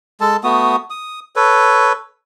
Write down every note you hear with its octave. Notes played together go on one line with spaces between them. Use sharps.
G#3 A4 A5
A3 B3 F#4 D#6
D#6
A4 B4 C#5